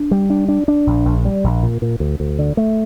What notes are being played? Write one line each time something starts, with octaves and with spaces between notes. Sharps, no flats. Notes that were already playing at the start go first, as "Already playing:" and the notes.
Already playing: D4
G3
D4
D4
D4
A#1
A#1
G3
A#1
A#2
A#2
D2
D2
D3
A3